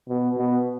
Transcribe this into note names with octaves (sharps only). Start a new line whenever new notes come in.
B2
B2